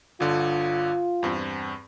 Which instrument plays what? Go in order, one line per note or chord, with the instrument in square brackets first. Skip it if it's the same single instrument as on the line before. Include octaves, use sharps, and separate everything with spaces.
[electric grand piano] G1 D3 [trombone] F4
[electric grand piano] E2 G2 C4